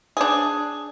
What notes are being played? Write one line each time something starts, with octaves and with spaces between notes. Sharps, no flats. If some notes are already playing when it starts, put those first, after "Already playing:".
D4 G#4